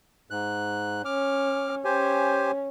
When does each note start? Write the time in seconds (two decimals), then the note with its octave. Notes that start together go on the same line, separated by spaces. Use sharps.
0.30 G#2 F#6
1.05 C#4 D6 F6
1.85 C#4 G4 C5 G#5